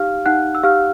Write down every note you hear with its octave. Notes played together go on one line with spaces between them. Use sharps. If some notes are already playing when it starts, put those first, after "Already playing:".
Already playing: D#4 G4 F5 F6
D#4 F#5 F#6
E6
G4 F5 F6